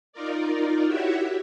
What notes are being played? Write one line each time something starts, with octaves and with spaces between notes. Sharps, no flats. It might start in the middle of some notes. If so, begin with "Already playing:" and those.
D#4 F4 A#4 D5
E4 F#4 G4 C#5 E5 F#5